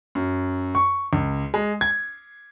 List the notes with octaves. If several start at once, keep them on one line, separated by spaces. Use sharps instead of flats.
F#2
C#6
C#2
G#3
G#6